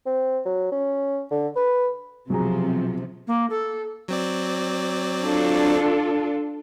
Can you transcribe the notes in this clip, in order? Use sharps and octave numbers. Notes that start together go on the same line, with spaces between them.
C4
F#3
C#4
D3
B4
B1 C3 F3 F#3 G#4 A#5
A#3
A4
F#3 C4 D5
D4 F4 A4